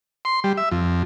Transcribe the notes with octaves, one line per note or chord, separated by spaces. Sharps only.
C6
G3
E5
F2